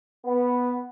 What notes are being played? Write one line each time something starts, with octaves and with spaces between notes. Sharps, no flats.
B3